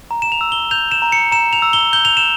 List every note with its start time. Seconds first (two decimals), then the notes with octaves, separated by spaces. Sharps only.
0.11 A#5
0.22 E7
0.32 F7
0.41 E6
0.52 G7
0.71 G6 F7
0.91 E7
1.02 A#5
1.12 C#7
1.32 A#5 E7
1.53 F7
1.62 E6
1.73 G7
1.93 G6 G7
2.05 F7
2.17 E7